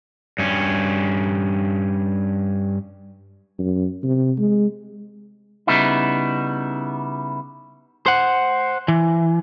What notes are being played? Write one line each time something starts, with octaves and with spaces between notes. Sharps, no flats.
G2 C#4
F#2
C3
G#3
C#3 G3 B3 D#4 E4
C5 F#5
E3